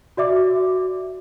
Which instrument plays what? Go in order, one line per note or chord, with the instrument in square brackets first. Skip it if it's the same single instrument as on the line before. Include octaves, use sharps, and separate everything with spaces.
[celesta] F#4 D5 E5 D6